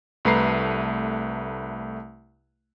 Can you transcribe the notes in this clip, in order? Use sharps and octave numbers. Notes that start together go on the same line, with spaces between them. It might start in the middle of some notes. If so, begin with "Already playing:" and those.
C2 A3 B4 A#5 C7